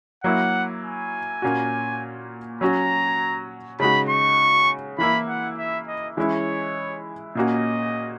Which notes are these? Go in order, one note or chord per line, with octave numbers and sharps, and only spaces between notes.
F#3 A#3 E4 F#5
G#5
A#2 A#3 C#4 F#4
F#3 C#4 F#4 A#5
C#3 G#3 D#4 F#4 B5
C#6
E3 A#3 E4 B5
F#5
E5
D#5
E3 G#3 C#4 E4 C#5
A#2 A#3 C#4 F#4 D#5